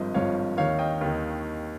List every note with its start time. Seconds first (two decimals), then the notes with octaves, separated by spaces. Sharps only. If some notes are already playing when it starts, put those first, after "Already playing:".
Already playing: G#1 G2 F3 C5 D#5
0.14 G#1 G2 F3 C#5 F5
0.57 D#2 D#3 C#5 F5
0.79 D#5 G5
1.01 D#2 D#3